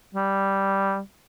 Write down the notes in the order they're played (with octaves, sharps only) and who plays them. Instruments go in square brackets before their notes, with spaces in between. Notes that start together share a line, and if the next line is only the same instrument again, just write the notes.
[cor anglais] G3